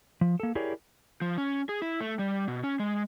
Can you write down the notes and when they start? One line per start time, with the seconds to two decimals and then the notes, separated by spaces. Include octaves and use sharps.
0.21 F3
0.40 A#3 A4
0.55 E4 G4 G#4 A#4 C#5 D5
1.21 F3
1.38 C#4
1.69 G#4
1.82 E4
2.01 A3
2.19 G3
2.48 B2
2.64 C#4
2.80 G#3